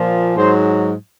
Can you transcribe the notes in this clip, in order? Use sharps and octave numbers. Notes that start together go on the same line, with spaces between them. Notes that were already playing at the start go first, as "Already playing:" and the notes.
Already playing: A#2 F3
G#2 F#3 C5